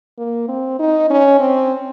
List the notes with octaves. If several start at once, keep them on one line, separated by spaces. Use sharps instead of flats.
A#3
C4
D#4
C#4
C4